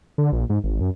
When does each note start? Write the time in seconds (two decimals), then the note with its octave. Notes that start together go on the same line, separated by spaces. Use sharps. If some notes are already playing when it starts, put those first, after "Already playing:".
0.18 D3
0.32 A#1
0.49 G#2
0.64 G#1
0.80 F#2